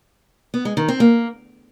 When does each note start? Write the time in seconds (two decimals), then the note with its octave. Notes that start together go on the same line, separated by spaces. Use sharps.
0.54 B3
0.65 G#3
0.77 D#3
0.88 C4
1.00 A#3